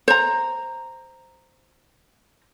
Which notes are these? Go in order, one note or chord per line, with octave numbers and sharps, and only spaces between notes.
C5 A#5